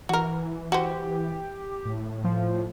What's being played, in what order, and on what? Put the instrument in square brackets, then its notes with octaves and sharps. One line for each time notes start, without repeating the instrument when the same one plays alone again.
[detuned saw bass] E3 [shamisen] F#4 A#4
[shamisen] F#4 C5 [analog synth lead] G4
[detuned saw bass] A2
[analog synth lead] F3